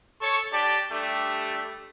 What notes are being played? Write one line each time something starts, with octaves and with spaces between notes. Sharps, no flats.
A4 C#5 C#6
D4 G4 D5 A5
G3 A3 D4 G4